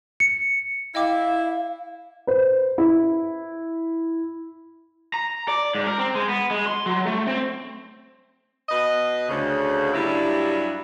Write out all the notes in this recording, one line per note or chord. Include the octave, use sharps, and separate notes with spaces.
C#7
E4 D#5 F5 G5 D6
B4 C5
E4
A#5
D5
G#2
A#4
C4
G#3
B3
G#3
C6
F#3
A3
C4
B2 B4 D#5
D2 C#3
G2 F#3 G3 E4